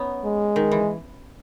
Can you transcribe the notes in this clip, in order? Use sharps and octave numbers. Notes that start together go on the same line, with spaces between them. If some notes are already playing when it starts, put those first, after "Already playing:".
Already playing: B3 C#4 D#4
G#3
D#3
E3